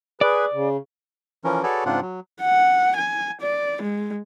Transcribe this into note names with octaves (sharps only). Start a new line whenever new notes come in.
G#4 B4 D5
C#3
E3 F3 C#4 A#4
F#4 G#4 A4 B4 C#5 D5
G#2 C#3 C4 D4 F4 F#5
F#3
F#5
G#5
D5
G#3